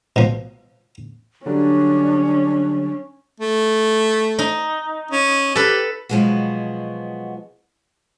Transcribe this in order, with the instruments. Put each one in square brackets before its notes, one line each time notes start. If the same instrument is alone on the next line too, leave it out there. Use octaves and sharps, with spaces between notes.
[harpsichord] B2 F3
[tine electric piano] D3 F#3 G3 [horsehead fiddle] C#4 [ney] D4
[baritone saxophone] A3
[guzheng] D#4
[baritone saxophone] C#4
[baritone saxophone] G4 [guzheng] A4 B4
[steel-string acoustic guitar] B2 F3 F#3 G#3 B3 F#4